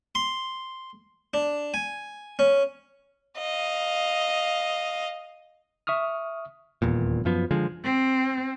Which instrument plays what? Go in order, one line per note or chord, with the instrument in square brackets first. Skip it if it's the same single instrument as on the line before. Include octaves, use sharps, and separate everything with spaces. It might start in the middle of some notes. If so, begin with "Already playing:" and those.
[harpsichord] C6
D4
G#5
C#4
[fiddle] D#5 F5
[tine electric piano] E5 C#6 D#6 F6
[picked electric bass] D#1 E2 A#2
F#2 F3 B3
D3 F3 G#3
[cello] C4